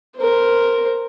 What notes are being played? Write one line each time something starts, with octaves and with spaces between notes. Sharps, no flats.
A#4 C5